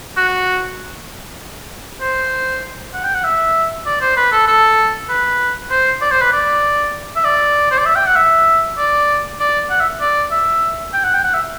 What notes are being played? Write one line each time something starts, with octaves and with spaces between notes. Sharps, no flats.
F#4
C5
F#5
G5
F#5
E5
D5
C5
B4
A4
A4
B4
C5
D5
C5
B4
D5
E5
D5
C5
D5
E5
G5
F#5
E5
D5
D5
F#5
E5
D5
E5
G5
F#5
G5
F#5
E5